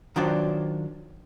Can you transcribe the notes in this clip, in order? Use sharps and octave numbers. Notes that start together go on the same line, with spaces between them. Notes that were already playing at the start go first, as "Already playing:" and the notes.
D#3 F#3 D4 F4 C5 D5